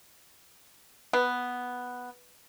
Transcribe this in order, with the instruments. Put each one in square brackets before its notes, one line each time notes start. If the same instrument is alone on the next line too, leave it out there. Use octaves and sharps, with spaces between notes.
[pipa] B3